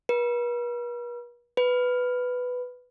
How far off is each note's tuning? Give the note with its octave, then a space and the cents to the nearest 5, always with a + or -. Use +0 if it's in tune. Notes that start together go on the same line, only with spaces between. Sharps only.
B4 -45
B4 +5